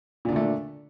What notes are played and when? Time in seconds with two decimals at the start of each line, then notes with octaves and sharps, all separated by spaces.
0.25 A#2
0.29 D4
0.32 D3
0.36 A3